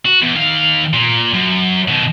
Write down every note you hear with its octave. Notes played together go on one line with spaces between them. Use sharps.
F#4
E2
D#2 F5
A#2
F#2
B2 D#3